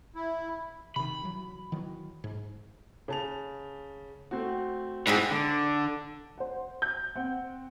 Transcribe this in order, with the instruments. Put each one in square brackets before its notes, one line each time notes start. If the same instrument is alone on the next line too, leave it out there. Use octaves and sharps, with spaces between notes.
[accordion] E4
[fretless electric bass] C3 D#3 [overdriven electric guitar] B5
[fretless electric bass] E3 F#3
D#3 E3 F#3
G#2
[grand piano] C#3 A5 F7
A3 C4 F#4
[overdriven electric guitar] G#2 [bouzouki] C4 E4 G#4
[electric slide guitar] D3
[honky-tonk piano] C5 F#5
G6
C4 F#5